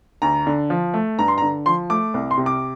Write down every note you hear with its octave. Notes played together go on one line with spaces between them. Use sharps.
D2 A#5
D3
F3
A3
G2 A#5
C6
A#5
D3
F3 C6
A3 D6
C2
C6
C3
D6